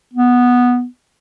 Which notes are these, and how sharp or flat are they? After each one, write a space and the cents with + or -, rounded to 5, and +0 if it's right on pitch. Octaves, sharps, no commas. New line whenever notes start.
B3 -5